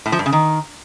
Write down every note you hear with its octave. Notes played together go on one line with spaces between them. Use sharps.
A2
F3
G2
C#3
D#3